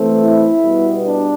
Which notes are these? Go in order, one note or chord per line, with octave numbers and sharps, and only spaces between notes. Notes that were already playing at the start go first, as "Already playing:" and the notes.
Already playing: E3 A3 C4
E4
B2 G3 B3
D4